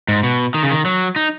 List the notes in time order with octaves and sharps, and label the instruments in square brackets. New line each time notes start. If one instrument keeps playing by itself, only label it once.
[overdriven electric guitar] G#2
B2
D#3
C#3
D#3
F#3
D#4